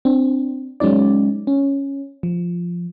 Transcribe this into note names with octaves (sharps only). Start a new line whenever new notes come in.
C4 D4
F#3 G#3 C#4 D#4 D5
C#4
F3